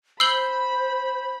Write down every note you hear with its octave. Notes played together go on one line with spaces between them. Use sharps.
C5 B5 E6 G6 C7 F#7